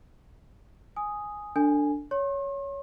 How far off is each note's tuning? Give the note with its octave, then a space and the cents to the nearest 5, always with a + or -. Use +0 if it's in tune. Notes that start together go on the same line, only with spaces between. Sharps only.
G#5 +0 D#6 +0
D4 +0 A4 +30 G#5 +0
C#5 +10 C6 +45